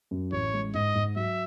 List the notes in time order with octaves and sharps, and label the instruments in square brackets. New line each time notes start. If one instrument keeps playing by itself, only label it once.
[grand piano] F#2
[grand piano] A1 [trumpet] C#5
[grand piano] G#3
[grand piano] G#2 [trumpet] D#5
[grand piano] G#2
[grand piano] F#3 [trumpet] E5